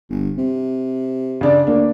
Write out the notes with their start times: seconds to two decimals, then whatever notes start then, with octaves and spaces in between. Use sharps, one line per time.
0.09 G1
0.38 C3
1.41 C#3 D4 D5
1.67 D2 A#3 D4